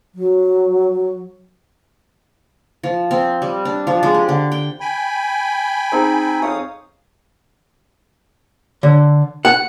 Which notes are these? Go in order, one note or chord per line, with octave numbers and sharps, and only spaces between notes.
F#3
F3
C4
G3
D4
F3
G#3
G4
D3
G5
G5 G#5 B5
C4 D#4 G#4
F2 C#5 F5 D#6
D3
F#5